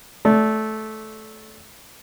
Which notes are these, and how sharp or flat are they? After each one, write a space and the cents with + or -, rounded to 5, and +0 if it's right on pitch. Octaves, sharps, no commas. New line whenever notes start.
A3 -15 D5 -30